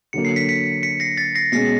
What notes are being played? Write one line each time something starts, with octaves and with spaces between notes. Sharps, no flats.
D3 F#3 A#3 C#7
C7
B6 C#7
B6 C#7
B6 C#7
A#6 C7
A6 B6
A#6 C7
B2 G#3 C#4 A#6 C7